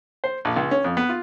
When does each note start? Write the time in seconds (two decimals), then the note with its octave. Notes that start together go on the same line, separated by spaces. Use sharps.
0.24 C5
0.45 A#1
0.56 C#2
0.71 C#4
0.84 F2
0.97 B3
1.09 F4